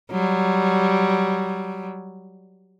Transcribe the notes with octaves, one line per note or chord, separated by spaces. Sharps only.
F#3 G3